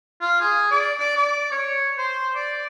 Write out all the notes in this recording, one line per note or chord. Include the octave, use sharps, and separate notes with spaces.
F4
G#4
D5
D5
D5
C#5
C5
D5